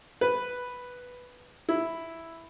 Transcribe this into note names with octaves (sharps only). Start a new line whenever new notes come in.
B4
E4